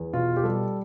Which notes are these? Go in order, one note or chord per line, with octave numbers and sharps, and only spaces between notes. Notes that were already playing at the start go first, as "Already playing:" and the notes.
Already playing: E2
B2 F4
G4
G3 A4